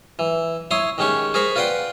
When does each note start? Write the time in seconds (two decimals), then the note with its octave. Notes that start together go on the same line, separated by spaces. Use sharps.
0.19 E3
0.71 E4 C#5 C6 D#6
0.98 D#3 G#3 C#4 G4 C#6
1.34 G#4 A#4 C5 B5 C#6
1.56 F4 B4 D5 F#5 G5 C6